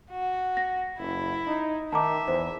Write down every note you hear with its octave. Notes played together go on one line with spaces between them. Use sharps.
F#4
A#6
F#1 E4
D#4
D#3 E5 A5 A#5 D6
E2 C5